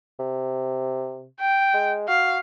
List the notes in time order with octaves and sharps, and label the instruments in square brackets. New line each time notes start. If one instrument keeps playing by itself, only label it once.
[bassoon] C3
[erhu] G5
[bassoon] G#3
[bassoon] F#4 [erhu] F5